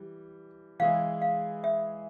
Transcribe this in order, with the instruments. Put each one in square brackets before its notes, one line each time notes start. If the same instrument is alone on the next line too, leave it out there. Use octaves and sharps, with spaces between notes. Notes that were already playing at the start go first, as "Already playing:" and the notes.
Already playing: [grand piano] E3 G3
[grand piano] E3 G#3 E4 G#4 [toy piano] F5
[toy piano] F5
E5